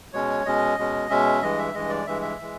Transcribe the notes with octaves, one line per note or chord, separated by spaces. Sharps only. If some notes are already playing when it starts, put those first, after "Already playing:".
B2 G#3 C#4 C#5
B2 G#3 C#4 D#5
B2 G#3 C#4
B2 G#3 C#4 E5
G2 E3 G#3 D#5
E5
G2 E3 G#3 D#5
D5
G2 E3 G#3 E5
E5
E3 G#3